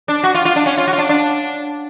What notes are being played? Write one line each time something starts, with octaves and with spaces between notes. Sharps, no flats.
D4
F#4
F4
F4
D4
C#4
F4
F#4
F4
D4
D4